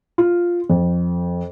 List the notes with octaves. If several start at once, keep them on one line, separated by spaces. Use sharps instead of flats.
F4
F2